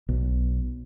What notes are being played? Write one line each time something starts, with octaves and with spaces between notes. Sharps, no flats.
B1